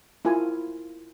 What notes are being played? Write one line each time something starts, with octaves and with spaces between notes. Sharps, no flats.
E4 F4 A#4 G#5